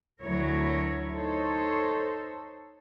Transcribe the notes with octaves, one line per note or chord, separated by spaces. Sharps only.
D2 F#3 E4 A#4 C#5
D#4 A4 C5 C#5